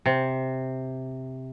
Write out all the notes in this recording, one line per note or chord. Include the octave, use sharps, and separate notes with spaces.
C3